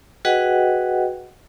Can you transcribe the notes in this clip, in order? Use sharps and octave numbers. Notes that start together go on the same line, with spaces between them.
F#4 G#4 B4 D#5 F#5 G5